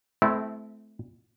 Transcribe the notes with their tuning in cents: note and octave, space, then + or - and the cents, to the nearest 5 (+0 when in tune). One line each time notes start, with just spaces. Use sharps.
A3 -30 C4 -25 E4 +0